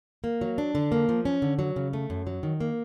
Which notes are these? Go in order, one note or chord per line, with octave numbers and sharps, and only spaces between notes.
A#3
F#3
D4
D3
A#3
F3
C#4
D3
F#3
C#3
A3
F#2
F#3
D#3
A#3